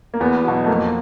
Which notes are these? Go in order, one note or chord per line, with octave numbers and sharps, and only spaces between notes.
A#3
E2 B3
B2 F#3
A3
F2 A#3